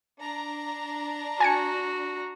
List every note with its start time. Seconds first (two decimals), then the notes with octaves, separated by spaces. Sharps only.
0.21 D4 A#5
1.40 F#4 G#5 A5 C#7